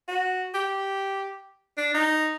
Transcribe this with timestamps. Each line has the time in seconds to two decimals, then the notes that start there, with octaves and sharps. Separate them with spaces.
0.08 F#4
0.54 G4
1.77 D4
1.94 D#4